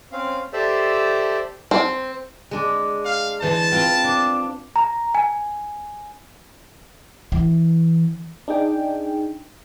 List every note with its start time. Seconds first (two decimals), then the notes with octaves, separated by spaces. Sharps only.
0.12 C4 C#4 F5
0.53 G4 A4 C5 D5 E5
1.71 C4
2.51 G#3 D4
3.05 F5
3.42 E3 C5 A5
3.72 C4 F4 B4
4.04 D4
4.76 A#5
5.15 G#5
7.32 E3
8.48 D4 D#4 G#4 G5